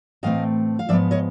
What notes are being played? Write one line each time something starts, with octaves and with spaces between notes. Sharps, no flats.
A2 E3 A3 C4 D#5 F5
F5
G#2 F3 G#3 B3 D5 E5
C#5 D#5